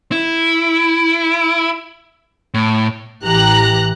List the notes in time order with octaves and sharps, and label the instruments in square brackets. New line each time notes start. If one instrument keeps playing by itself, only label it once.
[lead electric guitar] E4
A2
[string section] A1 E3 G4 A#5 F#6